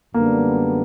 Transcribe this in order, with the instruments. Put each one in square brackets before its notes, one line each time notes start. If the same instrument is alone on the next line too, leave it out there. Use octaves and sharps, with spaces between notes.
[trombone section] F#2 D3 G3 B3 D4 [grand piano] A#3